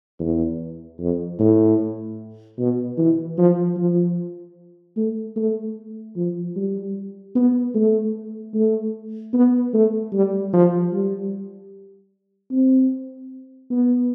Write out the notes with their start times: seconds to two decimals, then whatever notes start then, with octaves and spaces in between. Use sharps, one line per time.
0.20 E2
1.00 F2
1.39 A2
2.58 B2
2.98 E3
3.38 F3
3.77 F3
4.97 A3
5.36 A3
6.16 F3
6.56 G3
7.35 B3
7.75 A3
8.54 A3
9.34 B3
9.74 A3
10.13 G3
10.53 F3
10.93 G3
12.51 C4
13.70 B3